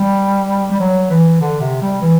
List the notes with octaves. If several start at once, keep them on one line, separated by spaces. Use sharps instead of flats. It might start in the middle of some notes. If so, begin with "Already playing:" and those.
Already playing: G3
G3
F#3
E3
D3
C3
G3
E3